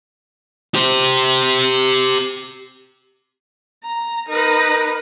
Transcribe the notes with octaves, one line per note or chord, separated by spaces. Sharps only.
G4 C5
A#5
D#4 A#4 B4